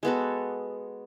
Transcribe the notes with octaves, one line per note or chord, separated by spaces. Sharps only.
G#3 B3 F#4 A4